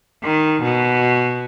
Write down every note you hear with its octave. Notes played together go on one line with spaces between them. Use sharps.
D#3
B2